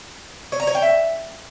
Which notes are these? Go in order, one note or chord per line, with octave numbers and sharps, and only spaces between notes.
C#5
A#5
C#5
G5
E5